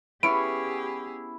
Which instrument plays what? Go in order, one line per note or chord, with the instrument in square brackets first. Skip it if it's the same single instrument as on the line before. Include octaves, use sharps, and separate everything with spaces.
[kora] B3 C#4 C#5 [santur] E4 [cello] G4 G#4 [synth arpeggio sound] D7